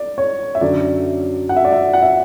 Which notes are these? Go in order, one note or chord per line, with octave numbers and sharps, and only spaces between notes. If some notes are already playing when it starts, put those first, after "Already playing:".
Already playing: D5
C#5
E5
F#2 D3 F#3 D5
F#5
E5
D5
E5
F#5
E5